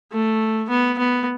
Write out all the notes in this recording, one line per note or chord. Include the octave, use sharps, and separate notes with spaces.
A3
B3
B3